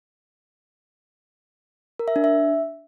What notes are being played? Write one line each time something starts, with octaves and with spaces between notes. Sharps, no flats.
A#4
E5
D4
E5